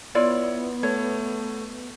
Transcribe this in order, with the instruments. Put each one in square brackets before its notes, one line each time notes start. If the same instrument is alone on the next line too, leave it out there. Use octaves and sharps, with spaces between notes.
[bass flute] B3 [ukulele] E4 F4 D5 [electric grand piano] C#5
[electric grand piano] A3 [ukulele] C#5